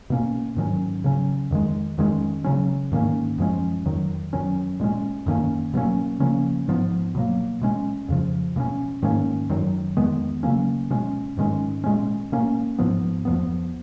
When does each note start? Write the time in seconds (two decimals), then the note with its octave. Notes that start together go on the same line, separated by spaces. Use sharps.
0.10 B2 A#3 C#4
0.57 G#2 D#3 F#3 C#4
1.04 C#3 F#3 C#4
1.51 F2 D#3 G#3
1.98 F2 D#3 G#3 C#4
2.44 C#3 F#3 C#4
2.92 G#2 D#3 A#3 C#4
3.38 F#2 F3 G#3 C#4
3.85 F2 D#3 F#3
4.33 F#2 D#3 F#3 C#4
4.80 A#2 G#3 C#4
5.26 F#2 D#3 A#3 C#4
5.74 B2 F#3 A#3 C#4
6.20 C#3 F3 A#3 C#4
6.68 G#2 F3 B3
7.15 B2 F#3 A#3
7.61 B2 G#3 C#4
8.08 F2 C#3 F3
8.56 B2 A#3
8.60 C#4
9.02 G#2 D#3 A#3 C#4
9.49 F#2 D#3 F#3
9.97 F2 D#3 G#3 B3
10.43 C#3 F#3 A#3 C#4
10.90 B2 G#3 C#4
11.37 G#2 D#3 G#3 C#4
11.84 A#2 G#3 C#4
12.32 B2 A#3 C#4
12.79 G#2 F3 B3
13.25 F2 F3 B3